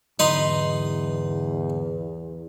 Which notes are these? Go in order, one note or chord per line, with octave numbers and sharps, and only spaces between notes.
E2 G#2 D3 F#3 D#4 B4 C6